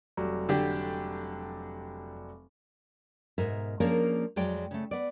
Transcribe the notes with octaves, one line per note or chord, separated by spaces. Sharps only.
F1 F#3 G3
D3 D4 G4
G#2 B2 A#4 E5
F3 A#3 C#4 D4 G#4 A#4
F2 F#3 G#3 D5 G5
C#3 A3
B3 D5